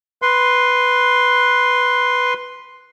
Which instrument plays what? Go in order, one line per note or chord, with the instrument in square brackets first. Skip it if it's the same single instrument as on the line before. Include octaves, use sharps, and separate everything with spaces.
[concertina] B4 C6